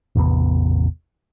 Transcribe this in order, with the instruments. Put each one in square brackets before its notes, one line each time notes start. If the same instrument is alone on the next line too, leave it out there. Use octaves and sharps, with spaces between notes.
[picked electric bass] A1 E2 C3 B3